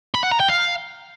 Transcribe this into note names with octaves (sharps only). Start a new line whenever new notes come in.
B5
F#5
A#5
G5
F5